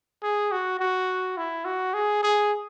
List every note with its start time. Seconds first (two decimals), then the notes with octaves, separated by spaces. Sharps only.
0.23 G#4
0.51 F#4
0.79 F#4
1.37 E4
1.65 F#4
1.94 G#4
2.23 G#4